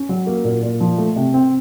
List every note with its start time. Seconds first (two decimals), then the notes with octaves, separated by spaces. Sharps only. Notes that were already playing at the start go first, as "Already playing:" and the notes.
Already playing: C#4
0.09 F#3
0.27 A#3
0.44 A#2
0.62 A#2
0.80 F3
0.98 A3
1.16 C3
1.34 C4